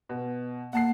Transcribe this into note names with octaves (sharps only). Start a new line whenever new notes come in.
B2
A#3 F#5 A5 C7